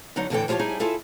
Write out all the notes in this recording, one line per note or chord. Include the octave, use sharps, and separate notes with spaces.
G2 D3 F#3 D#4 F#5
E2 A2 D3 E3 A4 G5
F3 E4 F4 G4 C#5 A5
F2 G3 D#4 E4 G#4 G#5
E4 F4 G#4 A4 E5